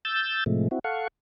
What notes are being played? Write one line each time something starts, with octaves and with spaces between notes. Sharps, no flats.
E6 G6 A6
A2 C3 F3 G#3 A3
C4 E4 F#4
A4 F5 F#5 C#6